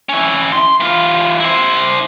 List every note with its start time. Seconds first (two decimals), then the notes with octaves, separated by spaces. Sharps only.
0.09 C#4 E4
0.52 C6
0.80 E3 F4
1.40 E4 C5